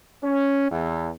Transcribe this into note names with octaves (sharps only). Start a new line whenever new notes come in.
C#4
E2